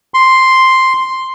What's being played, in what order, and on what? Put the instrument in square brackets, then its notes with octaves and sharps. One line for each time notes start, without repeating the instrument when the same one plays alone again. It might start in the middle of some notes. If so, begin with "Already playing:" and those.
[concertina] C6